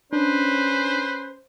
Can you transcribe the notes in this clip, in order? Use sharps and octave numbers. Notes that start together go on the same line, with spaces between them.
C#4 D4 B4 C5